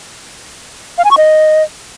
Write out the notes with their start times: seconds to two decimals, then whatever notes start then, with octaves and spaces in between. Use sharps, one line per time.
0.98 F5
1.05 G#5
1.11 C#6
1.18 D#5